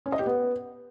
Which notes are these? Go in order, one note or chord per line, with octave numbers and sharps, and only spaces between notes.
C#4
D#5
G4
B3